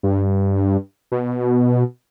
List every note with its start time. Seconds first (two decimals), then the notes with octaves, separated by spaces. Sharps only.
0.03 G2
1.12 B2